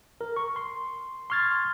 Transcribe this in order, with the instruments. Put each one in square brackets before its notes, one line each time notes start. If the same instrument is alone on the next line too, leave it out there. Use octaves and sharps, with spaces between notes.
[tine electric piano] A#4
C#6
C6
C6 C#6 F6 G#6 A6